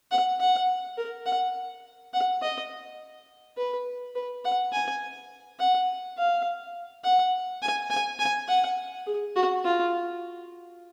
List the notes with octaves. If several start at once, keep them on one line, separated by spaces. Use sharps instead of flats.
F#5
F#5
A#4
F#5
F#5
D#5
B4
B4
F#5
G#5
F#5
F5
F#5
G#5
G#5
G#5
F#5
G#4
F#4
F4